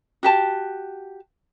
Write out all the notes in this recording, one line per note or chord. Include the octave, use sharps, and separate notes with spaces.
F#4 G4 A5